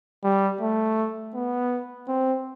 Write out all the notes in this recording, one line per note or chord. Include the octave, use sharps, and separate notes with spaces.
G3
A3
B3
C4